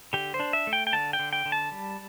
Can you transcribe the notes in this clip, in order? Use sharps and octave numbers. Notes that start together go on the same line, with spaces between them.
D3 G4
C5
D4
E5
A3
G5
G5
D3 A5
G5
D3
G5
D3
A5
G3